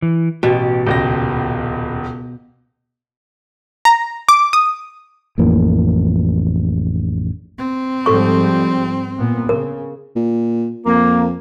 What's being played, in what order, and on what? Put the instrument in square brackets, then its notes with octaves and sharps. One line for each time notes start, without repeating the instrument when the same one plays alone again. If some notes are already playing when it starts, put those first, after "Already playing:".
[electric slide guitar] E3
[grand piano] A1 [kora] B2 [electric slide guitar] G4
[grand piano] D#1 C#2 A#6 [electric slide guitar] G4
[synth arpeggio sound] A#5
D6
D#6
[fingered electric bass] A1 F2 E3 A#3
[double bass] C4
[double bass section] G#2 F3 G3 [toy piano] A4 C#6
[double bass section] A#2 B3
[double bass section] C#3 [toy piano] A#4
[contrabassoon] A#2
[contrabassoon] F2 [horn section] A#3